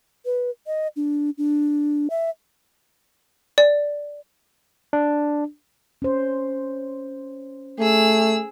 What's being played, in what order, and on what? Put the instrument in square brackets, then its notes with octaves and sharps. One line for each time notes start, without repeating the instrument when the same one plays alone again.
[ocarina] B4
D#5
D4
D4
E5
[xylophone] D5
[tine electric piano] D4
[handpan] C#4 C5
[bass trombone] A3 [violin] G#4 E6